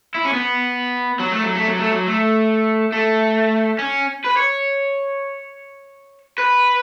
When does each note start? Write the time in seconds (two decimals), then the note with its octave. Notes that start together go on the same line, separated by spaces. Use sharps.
0.15 E4
0.25 C#4
0.33 B3
1.20 F#3
1.32 A3
1.43 F#3
1.55 A3
1.67 F#3
1.79 A3
1.90 F#3
2.06 A3
2.93 A3
3.79 C#4
4.25 B4
4.37 C#5
6.38 B4